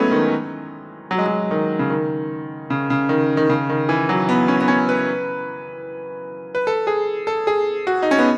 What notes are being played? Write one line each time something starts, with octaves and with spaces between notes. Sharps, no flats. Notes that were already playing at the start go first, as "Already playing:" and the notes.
Already playing: E3 F#3 G#3 A3 B3 C#4
D#3
F#3
G#3
F#3
D#3
C#3
D#3
C#3
C#3
D#3
D#3
C#3
D#3
E3
F#3
B3
C#4
B3
C#4
B4
B4
A4
G#4
A4
G#4
F#4
D#4
C#4
B3